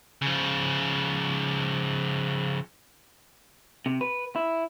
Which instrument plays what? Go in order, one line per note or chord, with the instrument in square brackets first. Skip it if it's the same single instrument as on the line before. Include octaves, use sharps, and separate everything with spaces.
[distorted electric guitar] C#3 F3
[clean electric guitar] C3
B4
E4